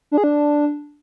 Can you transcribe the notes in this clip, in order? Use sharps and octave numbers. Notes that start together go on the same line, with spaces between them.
D4
G#4
D4